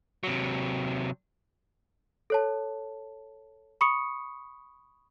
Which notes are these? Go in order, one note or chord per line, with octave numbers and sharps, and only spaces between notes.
C3 F#3
A4 C#5 A5
B5 C#6 D#6 C#7